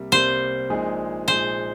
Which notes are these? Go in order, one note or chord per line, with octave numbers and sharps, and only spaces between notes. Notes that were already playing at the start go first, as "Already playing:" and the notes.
Already playing: C2 C3 G3 A#3
C2 C3 G3 A#3 C5
A#1 A#2 G#3 D#4 G#4
A#1 A#2 G#3 D#4 G#4 C5